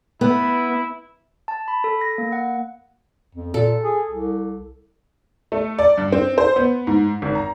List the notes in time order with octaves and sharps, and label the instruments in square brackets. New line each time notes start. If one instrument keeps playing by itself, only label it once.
[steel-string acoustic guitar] B3 [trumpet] E4
[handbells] A5
B5
A4
A#6
A#3
F#5
[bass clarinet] F2
[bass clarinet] A#2 [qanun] A4
[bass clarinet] G#4
C2
[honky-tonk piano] A3
D5
G2
C4
C5
B3
G#2
G#1
A#5